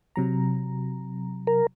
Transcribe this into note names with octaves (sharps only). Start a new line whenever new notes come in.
C3 F#3 A#5
A#4